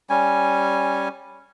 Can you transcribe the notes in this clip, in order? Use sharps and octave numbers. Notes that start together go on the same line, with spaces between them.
G3 C#4 G#5